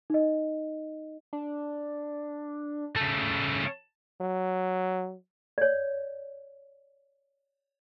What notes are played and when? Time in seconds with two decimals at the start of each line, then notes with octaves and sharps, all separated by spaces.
0.10 D#4 D#5
1.33 D4
2.96 C#3 A3 A5
4.20 F#3
5.58 C#5 D5